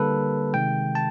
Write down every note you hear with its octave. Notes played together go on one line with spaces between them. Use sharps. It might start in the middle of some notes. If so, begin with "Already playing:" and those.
Already playing: D3 G3 A#3 A4 B4
C3 D#3 G#3 G5
A5